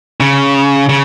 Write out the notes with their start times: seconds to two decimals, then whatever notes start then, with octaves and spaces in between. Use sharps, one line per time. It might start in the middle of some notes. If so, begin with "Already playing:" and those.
0.20 C#3
0.89 C#3